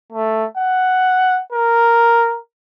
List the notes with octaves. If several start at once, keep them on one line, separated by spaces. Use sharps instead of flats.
A3
F#5
A#4